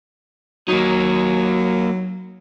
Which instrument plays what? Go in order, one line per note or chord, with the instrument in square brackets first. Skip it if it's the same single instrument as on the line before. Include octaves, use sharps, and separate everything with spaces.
[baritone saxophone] F#3 [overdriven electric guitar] A#3 D#4